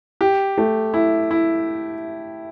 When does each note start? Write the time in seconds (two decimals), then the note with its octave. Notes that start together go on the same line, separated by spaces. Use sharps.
0.21 G4
0.58 A3
0.94 E4
1.31 E4